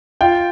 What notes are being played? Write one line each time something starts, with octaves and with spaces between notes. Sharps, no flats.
F4 G5